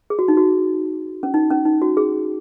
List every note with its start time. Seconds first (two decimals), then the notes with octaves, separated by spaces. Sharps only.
0.10 G#4
0.19 F#4
0.28 D#4
0.37 F#4
1.23 C#4
1.34 D#4
1.51 C#4
1.65 D#4
1.82 F#4
1.97 G#4